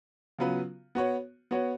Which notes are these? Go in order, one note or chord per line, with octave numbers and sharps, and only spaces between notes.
C#3 F#3 B3 F4 B4
B3 F#4 C#5
B3 F#4 C#5